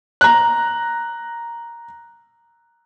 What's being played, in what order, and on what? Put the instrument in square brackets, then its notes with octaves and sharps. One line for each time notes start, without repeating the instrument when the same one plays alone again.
[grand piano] A#5 F#6